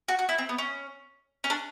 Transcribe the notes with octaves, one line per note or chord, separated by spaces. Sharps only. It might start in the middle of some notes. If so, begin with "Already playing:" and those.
F#4
F#4
E4
C4
B3
C#4
C#4
D4